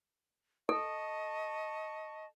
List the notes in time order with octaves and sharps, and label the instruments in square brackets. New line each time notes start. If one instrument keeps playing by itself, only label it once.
[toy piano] A4 [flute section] D#5 A5 C#6